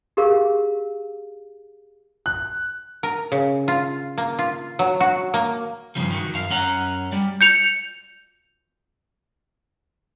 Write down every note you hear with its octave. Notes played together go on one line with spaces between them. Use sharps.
G4 G#4 A#4 F5
F#6
A#4
C#3
F4
A#3
F4
F#3
F#4
A#3
G2 C#3 F3 G3
D#3 F#3
F#2 F5
F#2 C#4 F#5 A#5
G3 D5
G6 C#7 F7